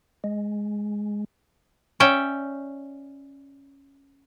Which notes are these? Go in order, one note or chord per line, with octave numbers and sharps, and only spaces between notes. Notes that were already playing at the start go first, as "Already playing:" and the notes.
G#3
C#4 D5 E5 G5